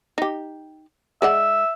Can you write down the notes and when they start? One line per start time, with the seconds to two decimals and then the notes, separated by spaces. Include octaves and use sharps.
0.18 D#4 G4
1.22 G#3 D5 E5 F#5